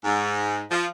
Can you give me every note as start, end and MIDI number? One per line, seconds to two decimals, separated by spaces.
0.04 0.63 44
0.71 0.86 53